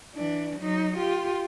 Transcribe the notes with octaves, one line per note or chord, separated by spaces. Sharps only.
E3 D4
F#3 D#4
F4 G4